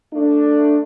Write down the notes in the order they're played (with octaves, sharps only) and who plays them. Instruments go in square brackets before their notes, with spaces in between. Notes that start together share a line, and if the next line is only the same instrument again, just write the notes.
[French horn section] A3 D4